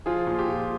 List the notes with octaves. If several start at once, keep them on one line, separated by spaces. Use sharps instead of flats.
F3 F4 G#4
A#2
G4
A#2